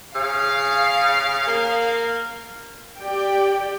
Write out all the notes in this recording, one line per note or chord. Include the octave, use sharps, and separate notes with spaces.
C#3 F5
A#3
G4 D5 G5